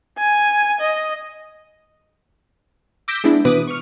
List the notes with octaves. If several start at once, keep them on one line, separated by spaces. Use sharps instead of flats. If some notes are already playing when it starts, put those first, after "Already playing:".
G#5
D#5
D6 E6 G6 A#6 B6 D7
G#3 B3 D4 E4
B2 E3 B4 D6 D#6
C#6 F6